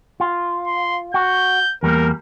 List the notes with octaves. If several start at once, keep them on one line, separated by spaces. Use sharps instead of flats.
F4
C6
F#4 G6
E2 G3 A#3 A#4